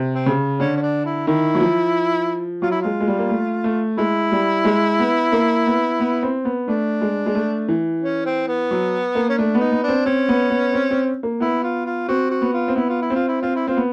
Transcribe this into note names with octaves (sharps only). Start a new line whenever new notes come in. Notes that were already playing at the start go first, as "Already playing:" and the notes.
Already playing: C3
C4
C#3
D3 C#4
C#4
D4
E4
D#3 E4
F#3
F3
F#3 F4
E4
G#3 F4
G#3
G3
A#3
A3
A3
G#3 E4
G3
G#3
B3
A#3
B3
B3
C4
B3
A3 D4
G#3
G#3
A3
E3
C#4
C4
B3
F#3
A#3
C#4
A3 D4
B3
D#4
B3
C4 D4
C4 C#4
B3
B3
C4
C4
A#3
B3 E4
F4
F4
C4 F#4
F#4
B3
F4
C4
B3 E4
F4
E4
C4
F4
E4
C4 F4
E4
C4 F4
B3